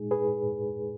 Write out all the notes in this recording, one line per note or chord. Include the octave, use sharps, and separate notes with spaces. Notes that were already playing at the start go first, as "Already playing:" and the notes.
Already playing: A#2 G#3 D#4 G#4
G#4 B4